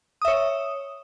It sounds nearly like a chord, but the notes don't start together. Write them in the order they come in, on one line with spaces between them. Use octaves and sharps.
D#6 E5 C#5